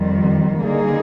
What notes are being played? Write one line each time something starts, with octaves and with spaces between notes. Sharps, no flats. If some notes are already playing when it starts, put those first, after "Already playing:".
Already playing: F2 D#3 G3
D3 G3 A#3 D#4 G#4